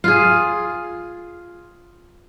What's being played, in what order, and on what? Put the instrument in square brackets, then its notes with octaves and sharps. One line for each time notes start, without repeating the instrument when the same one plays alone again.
[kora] F4 G#4